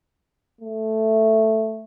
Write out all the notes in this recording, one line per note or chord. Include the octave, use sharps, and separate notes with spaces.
A3